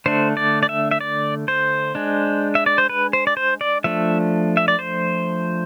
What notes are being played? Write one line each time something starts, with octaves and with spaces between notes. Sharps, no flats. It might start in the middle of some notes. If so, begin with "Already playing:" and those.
D3 A3 D4 C5
D5
D5
E5
E5
D5
C5
G#3 D4
E5
D5
C5
B4
C5
D5
C5
D5
F3 A3 D4 E5
E5
D5
C5